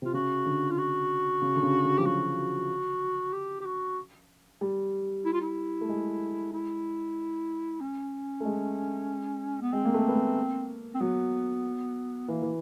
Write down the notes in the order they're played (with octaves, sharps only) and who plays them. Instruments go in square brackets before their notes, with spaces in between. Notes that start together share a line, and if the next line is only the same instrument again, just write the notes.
[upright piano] C3 [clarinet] F4
[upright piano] C#3 [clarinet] F#4
[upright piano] D3
[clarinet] F4
F#4
[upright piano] C#3
D3
C#3
D3
[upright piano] F3 [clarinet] G4
[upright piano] F#3 [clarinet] F#4
[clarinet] G4
G4
F#4
[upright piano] G3
[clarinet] E4
F4
E4
[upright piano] A3
G#3
[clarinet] E4
C#4
[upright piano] A3
G#3
[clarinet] B3
[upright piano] G#3 [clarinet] C4
[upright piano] A#3
A3
B3
A#3
[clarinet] C4
[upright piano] F#3 [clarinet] B3
[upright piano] E3 [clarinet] A#3
[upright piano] E3